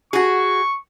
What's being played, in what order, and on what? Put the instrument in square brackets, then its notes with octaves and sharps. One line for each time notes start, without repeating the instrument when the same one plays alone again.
[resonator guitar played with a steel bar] F#4 G#4 [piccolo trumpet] C#6